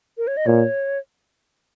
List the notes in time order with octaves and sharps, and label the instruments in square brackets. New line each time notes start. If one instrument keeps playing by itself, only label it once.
[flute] A#4
C#5
D#5
[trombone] A#2 [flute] C#5